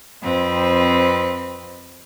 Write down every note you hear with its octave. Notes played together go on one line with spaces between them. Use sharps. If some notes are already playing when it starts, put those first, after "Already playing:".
F2 C4 B4